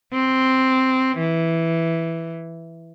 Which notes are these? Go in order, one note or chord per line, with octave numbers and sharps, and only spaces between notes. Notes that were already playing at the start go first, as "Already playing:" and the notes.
C4
E3